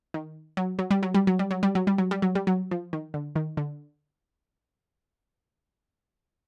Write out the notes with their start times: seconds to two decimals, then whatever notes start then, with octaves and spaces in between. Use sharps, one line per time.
0.14 D#3
0.57 F#3
0.79 F#3
0.91 G3
1.03 F#3
1.14 G3
1.27 F#3
1.39 G3
1.51 F#3
1.63 G3
1.75 F#3
1.87 G3
1.98 F#3
2.11 G3
2.22 F#3
2.35 G3
2.47 F#3
2.71 F3
2.93 D#3
3.14 D3
3.36 D#3
3.57 D3